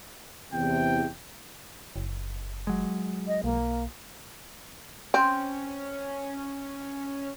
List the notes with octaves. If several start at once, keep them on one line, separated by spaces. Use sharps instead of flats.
E2 C3 G5
F#1
F#3 G#3
D#5
B1 A#3
C4 C#4